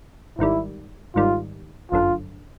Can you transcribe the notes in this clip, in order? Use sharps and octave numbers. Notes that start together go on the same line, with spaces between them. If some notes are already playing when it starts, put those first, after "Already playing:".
G#1 G#2 D#3 G3 E4
G#1 G#2 D#3 G3 F4
G1 F#2 D3 F4